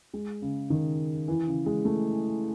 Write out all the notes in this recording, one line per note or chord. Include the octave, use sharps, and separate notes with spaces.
G#3
C#3
D#3
E3
C#3
G#3
A3